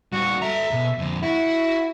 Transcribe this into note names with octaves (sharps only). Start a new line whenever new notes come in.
G3 D#4 F#4
A4 E5 A#5
B2
F2 D3
E4 F#4